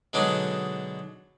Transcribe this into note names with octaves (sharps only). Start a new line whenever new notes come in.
B2 D3 F#3 G#3 D4 D#4